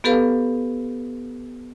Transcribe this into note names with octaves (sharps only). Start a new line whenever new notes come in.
B3 G4 A4 B4 F5